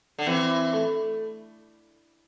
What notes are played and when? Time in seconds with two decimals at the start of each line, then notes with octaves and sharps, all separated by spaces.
0.19 D3
0.27 E3 C4
0.73 A3